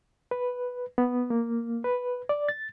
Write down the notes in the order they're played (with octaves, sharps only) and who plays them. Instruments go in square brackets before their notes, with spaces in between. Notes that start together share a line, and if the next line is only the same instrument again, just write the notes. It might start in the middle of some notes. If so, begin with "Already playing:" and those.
[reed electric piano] B4
B3
A#3
B4
D5
A6